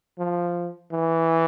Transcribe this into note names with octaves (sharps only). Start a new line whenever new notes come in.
F3
E3